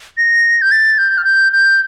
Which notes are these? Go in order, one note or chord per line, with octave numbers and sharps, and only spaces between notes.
A#6
G6
A6
G6
F6
G6
G6